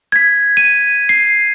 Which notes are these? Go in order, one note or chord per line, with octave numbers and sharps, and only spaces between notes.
G#6 B6
D#7
C7